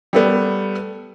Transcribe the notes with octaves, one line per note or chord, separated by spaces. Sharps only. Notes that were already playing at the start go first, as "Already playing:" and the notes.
G3 A3 B3